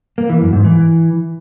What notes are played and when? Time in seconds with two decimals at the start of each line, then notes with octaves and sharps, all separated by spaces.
0.18 A#3
0.30 E3
0.41 F#2
0.53 G#2
0.64 E3